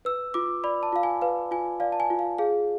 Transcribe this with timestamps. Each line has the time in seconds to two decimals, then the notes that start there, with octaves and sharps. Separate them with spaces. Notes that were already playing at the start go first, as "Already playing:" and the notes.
0.05 B4 E6
0.34 F4 D6
0.64 D5 B5
0.83 A5
0.92 F4 F5
1.03 G#5
1.22 B4 F5
1.51 F4 G#5
1.80 D5 F5
1.92 A5
2.00 G#5
2.10 F4
2.19 F5
2.38 G#4 F5